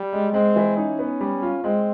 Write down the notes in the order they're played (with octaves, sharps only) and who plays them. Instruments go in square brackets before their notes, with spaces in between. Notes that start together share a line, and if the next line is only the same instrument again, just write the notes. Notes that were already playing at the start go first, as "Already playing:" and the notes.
Already playing: [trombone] G3
[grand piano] G#3
[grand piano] G#3 [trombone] C4
[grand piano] E3
[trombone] C#4 [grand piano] D#4
[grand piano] B3
G3
F4
[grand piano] G#3 [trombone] C4